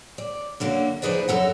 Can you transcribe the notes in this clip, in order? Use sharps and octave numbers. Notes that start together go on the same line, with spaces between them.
D5
F#2 D3 A#3 F#4
F3 D#4 E4 G#4 B4 D5
F#2 A4 A#4 F#5